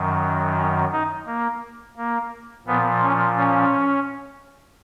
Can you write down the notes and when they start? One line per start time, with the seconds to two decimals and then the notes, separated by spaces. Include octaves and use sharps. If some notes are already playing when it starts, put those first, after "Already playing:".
Already playing: F#2 D#3 F#3
0.56 C#4
0.92 D#4
1.27 A#3
1.97 A#3
2.66 A#2 F3 B3
3.02 C#4
3.37 C#4